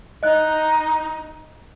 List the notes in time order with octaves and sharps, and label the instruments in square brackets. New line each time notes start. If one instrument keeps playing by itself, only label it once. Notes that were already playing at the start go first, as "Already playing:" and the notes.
[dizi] D#4 [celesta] D#5 F#6